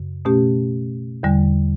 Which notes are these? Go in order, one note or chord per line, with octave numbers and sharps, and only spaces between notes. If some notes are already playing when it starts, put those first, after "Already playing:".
Already playing: F#2 C#3
B2 A3 C#4 G4
E2 D3 G3